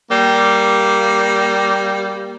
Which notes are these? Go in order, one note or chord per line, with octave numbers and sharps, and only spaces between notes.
G3 A#3